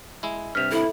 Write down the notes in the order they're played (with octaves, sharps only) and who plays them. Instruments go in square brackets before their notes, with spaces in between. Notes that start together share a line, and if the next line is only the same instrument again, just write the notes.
[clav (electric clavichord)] G#3 E4
[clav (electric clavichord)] G2 C3 [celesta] F6 B6 F7
[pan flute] E4 [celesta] A4 E5